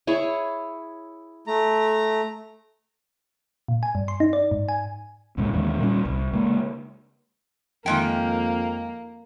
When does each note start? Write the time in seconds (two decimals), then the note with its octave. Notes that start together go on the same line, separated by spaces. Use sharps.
0.07 E4 G#4 C#5
1.47 A3 A#5
3.68 A#2
3.83 G#5
3.95 G2
4.08 C6
4.20 D#4
4.33 D5
4.51 G#2
4.69 G#5
5.37 C#2 A2 C#3 G#3
5.53 D#2 D#3 E3 G#3
5.79 A#2 G3 A#3 C#4
6.05 C2
6.33 C#3 G#3 A#3
7.86 F2 D#3 G#3 A#3 G5